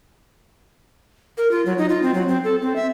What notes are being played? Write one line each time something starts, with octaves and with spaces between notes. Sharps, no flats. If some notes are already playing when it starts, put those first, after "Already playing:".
A#4
F4
F#3
D#4
F4
C4
F#3
C4
A4
C4
E5